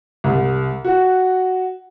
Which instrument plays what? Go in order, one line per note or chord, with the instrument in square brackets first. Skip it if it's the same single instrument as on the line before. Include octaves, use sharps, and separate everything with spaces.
[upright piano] C2
F#4